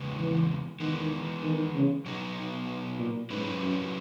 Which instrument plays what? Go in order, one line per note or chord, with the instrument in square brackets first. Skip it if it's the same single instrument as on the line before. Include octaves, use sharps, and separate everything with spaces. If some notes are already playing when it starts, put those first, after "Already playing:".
Already playing: [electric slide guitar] E2 C#3 G#3 B3
[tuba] E3
[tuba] D#3 [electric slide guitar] E3 G#3 B3
[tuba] D#3
C#3
[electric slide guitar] B2 F#3 B3 D#4
[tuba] A#2
[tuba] G#2 [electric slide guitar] F#3 C#4 E4 B4
[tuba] F#2